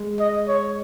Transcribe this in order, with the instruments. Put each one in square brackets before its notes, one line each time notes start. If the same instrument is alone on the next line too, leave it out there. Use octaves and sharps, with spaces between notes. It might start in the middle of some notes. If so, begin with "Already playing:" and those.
Already playing: [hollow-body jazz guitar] G#3
[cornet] D#5
C#5